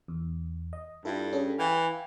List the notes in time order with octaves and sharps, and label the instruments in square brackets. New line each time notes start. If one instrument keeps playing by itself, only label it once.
[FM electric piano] E2
D#5
[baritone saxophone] G2 [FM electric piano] E4 F4 A4
[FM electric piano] C#4 G#4 A4
[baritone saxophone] E3 [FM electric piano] F5 G5 G#5